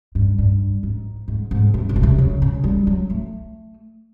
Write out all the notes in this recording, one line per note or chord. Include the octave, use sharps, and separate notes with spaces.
G2
G2
G#2
G#2
G#2
F#2
C3
B2
C3
C#3
C#3
G3
F#3
A3